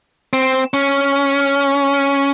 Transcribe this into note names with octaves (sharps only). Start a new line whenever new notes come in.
C4
C#4